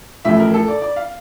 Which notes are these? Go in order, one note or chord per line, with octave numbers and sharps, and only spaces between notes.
A1 A2 F3 E5
A#4
A4
D5
D5
F5